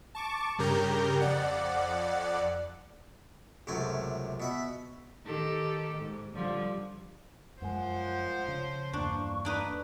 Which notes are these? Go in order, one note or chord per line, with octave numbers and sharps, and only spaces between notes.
A5 C#6 D6
G2 C#3 G4 A#4 A#5 G6
F2 D5 F#5
C#2 F#2 C3 A3 G5 G#5
B2 E5 B5
D#3 G4 A4
G#2
D3 F3 G3
F#2 F3 G#3 C5 F#5
C#3
E2 G2 A#3 D4 C#6
D4 D#4 B4